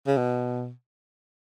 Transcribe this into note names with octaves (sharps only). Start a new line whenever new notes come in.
C#3
B2